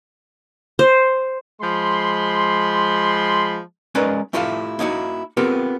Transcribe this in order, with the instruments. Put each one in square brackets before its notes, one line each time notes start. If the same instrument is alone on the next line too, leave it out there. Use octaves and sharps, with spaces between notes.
[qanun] C5
[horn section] F3 G#3 B5 C6
[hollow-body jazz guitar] G#3 C#4 D#4 A#4 B4 D5
A3 E4 F4 G4 A4 F5
A#3 D#4 E4 F#4
B3 C4 F4 G4 A4 A#4